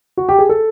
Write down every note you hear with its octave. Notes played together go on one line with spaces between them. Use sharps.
F#4
G4
G#4
A4